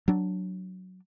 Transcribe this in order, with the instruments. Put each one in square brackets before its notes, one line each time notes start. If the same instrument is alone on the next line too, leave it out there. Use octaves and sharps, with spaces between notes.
[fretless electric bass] F#3 D4